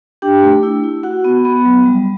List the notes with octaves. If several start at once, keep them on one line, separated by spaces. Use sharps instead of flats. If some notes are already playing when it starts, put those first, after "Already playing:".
D4 G4 G5
A3
E4
E4
F#4 F#5
B3
B3
F#3
G3